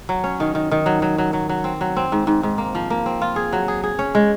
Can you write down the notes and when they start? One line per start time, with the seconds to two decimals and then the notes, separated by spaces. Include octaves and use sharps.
0.09 F#3
0.24 C#4
0.40 D#3
0.55 D#3
0.71 D#3
0.86 F#3
1.02 F#3
1.18 F#3
1.33 F#3
1.49 F#3
1.64 C4
1.81 F#3
1.97 C4
2.12 G#2
2.27 G#2
2.43 G#2
2.58 A#3
2.75 F3
2.90 A#3
3.06 C4
3.21 F4
3.36 G#4
3.53 F#3
3.68 G#4
3.84 G#4
3.99 C#4
4.15 G#3